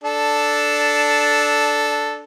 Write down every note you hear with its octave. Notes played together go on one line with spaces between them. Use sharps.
D4 A4